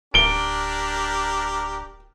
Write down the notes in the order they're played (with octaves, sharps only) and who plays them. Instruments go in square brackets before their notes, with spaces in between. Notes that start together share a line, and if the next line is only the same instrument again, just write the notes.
[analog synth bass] D1 [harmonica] D4 G4 A#4 [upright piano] D7 G7